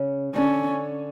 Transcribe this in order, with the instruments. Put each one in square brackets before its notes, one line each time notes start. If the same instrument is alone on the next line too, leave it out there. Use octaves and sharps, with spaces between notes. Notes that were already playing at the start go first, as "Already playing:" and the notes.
Already playing: [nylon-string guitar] C#3 C#4
[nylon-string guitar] D3 D4 [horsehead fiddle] C#4